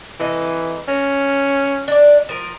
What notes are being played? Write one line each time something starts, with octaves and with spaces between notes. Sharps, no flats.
C3 E3 D#4 A4
C#4 A#4
D4 D5
F3 A#4